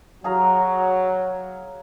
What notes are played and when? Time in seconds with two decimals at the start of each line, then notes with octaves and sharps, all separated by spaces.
0.24 F#3 G#4 F5 A#5